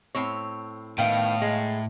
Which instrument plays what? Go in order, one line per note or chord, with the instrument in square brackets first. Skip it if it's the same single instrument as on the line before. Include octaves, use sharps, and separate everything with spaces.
[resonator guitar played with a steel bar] A2 C4 C#5
[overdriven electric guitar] A2 [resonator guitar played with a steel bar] D#3 B3 G5 [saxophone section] F5
[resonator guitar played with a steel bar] G#3